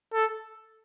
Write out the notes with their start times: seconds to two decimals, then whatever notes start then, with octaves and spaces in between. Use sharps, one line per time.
0.14 A4